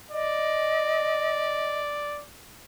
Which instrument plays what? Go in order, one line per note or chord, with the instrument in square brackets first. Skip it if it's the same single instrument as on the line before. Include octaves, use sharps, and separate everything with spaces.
[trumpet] D5 [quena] D#5